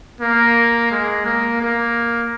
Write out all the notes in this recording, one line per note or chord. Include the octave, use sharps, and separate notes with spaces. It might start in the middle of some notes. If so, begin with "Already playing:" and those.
A#3
G#3
A#3
A#3